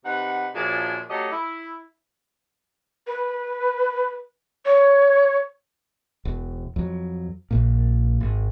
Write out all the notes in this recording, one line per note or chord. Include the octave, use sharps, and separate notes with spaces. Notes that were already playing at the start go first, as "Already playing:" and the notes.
C3 D#4 B4 F#5
F#2 A#2 F3 D4 F4 G#4
F#3 A3 C#4 G4 D#5
E4
B4
C#5
E1
F2 F#3
A#1 A#2
G#1